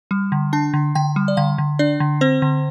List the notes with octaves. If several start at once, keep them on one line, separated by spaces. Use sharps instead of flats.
G3
D3
D4 A5
D3
D3 G5
G3
D5
D3 F5
D3
D4 D5
D3
C4 C5
D3